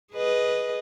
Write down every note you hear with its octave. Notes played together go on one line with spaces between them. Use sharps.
G#4 B4 D#5